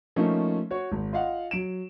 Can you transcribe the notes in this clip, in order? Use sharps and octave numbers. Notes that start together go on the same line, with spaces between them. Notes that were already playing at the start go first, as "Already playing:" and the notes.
F3 A3 A#3 C#4 D#4
F#4 C#5
G#1
F4 D#5 F5 F#5
F#3 D7 E7